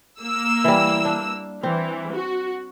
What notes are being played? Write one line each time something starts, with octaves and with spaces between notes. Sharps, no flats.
A#3 E6
E3 G3
D4
E3 C4
F#4